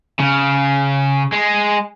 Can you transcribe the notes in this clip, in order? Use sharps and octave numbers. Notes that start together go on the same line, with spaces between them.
C#3
G#3